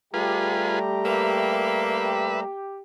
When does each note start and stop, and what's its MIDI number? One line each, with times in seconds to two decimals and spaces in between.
0.14 2.44 55
0.14 2.44 57
0.14 0.79 65
0.14 2.82 67
0.14 0.79 68
0.14 0.79 71
0.14 2.44 82
1.05 2.47 58
1.05 2.40 71
1.05 2.40 76